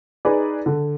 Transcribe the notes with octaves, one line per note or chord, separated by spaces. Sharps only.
D#4 G#4 B4 D5
D3